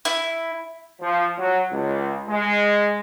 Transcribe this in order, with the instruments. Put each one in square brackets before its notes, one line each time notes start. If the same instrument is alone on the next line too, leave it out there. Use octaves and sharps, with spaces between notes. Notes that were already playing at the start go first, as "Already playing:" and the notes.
[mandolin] E4
[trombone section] F3
F#3
C#2
G#3